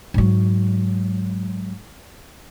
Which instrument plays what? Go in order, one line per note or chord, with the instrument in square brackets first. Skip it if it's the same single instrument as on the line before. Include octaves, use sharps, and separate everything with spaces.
[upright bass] G#2 F#3